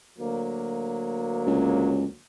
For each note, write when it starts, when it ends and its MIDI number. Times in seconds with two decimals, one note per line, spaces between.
0.19 2.19 38
0.19 2.19 54
0.19 2.19 58
1.47 2.05 37